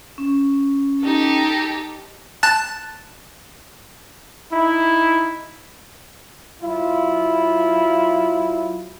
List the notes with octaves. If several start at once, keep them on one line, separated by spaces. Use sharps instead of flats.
C#4
D#4 G4 A4
A5 F#6 A6
D#4 E4
F#3 E4 F4